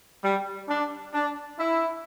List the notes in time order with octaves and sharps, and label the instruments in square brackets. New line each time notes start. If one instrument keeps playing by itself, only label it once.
[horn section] G3
D4
D4
E4